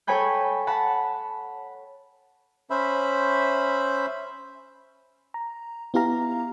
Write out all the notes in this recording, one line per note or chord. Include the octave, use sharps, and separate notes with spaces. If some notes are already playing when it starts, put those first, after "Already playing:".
A4 C#5 G5 G#5 B5 G6
F#5 A5 B5 A6
C#4 C5 E5 B5
A#5
B3 E4 G4 F5 A#5